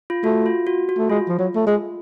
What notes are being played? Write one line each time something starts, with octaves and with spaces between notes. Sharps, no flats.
F4
A3 F#4
F4
F#4
F#4
A3
G#3 F4
F3
F#3
A3
G#3